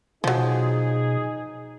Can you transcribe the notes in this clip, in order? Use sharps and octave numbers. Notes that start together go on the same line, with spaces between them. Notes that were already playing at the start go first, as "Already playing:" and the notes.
B2 F3 F#3 D#4 G#4